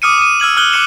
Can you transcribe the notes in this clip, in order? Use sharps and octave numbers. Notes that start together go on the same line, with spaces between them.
D6 D#6 F6 C#7 D#7
D#6 D#7
E6 F6 G#6 F#7
D#6 F6 F#6 F#7 G7
D6 F#6 C#7 E7 F#7